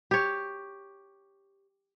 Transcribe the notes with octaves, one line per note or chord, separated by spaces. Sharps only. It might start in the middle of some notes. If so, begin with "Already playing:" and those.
G4 C#5